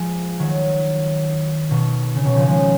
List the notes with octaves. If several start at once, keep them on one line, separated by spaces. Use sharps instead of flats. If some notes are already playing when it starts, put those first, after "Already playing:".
Already playing: F3 G#3
D#3 F#3
B2 D#3
C#3
B2 D#3
C#3 F3
F3 G#3